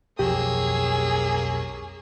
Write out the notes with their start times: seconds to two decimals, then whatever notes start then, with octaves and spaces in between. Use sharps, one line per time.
0.19 B1 F2 F3 A#3 G4 G#4 C#5 E6